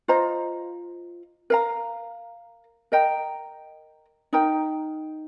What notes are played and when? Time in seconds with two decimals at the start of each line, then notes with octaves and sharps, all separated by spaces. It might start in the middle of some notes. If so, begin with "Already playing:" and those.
0.08 F4 C5 D#5 A#5
1.50 A#4 F5 A#5
2.92 A#4 D#5 G5 A#5
4.33 D#4 A#4 G5 A#5